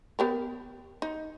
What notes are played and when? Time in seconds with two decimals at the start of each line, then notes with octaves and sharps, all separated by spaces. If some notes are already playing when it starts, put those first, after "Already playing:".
0.19 B3 G4 A#4
1.02 D#4